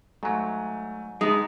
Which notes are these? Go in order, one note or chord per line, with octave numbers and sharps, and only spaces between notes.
G#2 F#3 A3
D3 G#3 B3 D#4 D#5